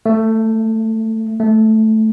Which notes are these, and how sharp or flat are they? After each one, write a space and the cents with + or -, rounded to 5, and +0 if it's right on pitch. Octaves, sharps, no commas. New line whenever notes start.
A3 +15
A3 -5